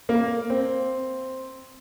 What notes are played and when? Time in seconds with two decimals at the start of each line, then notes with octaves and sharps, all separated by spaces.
0.09 A#3
0.50 C4